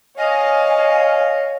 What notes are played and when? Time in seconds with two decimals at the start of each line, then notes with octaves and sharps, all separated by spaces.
0.18 C#5 D#5 F5 G#5